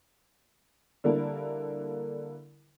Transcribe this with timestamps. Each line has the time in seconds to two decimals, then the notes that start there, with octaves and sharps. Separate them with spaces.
1.04 D3 G3 A#3 E4 A4 A#4